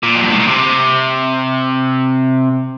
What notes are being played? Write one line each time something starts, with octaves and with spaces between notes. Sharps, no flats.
A#2
F2
G2
A2
A#2
C3